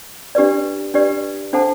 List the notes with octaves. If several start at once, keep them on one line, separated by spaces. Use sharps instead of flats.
D4 G4 B4 D5
D4 G4 B4 D5
D4 A4 C5 F#5 A5